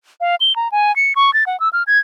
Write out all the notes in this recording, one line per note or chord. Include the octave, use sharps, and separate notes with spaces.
F5
G7
A#5
G#5
C#7
C#6
A6
F#5
E6
F6
G#6